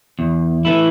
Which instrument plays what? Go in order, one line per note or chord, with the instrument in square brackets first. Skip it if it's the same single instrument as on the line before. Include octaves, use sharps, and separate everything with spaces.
[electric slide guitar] E2
E3 A3 E4